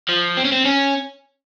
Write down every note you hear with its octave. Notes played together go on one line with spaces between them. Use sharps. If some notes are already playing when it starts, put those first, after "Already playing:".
F3
C4
C#4
C4
C#4